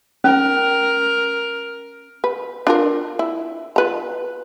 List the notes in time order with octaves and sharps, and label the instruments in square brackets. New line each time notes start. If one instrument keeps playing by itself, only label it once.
[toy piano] C#4 [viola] A#4
[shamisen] B4
D4 F4 A#4
E4
F4 B4 A#5